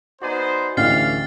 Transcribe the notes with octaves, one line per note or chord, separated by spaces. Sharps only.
B3 D#4 F#4 C5 D5 G#5
A1 D2 D3 E3 F5 F6 A6 C7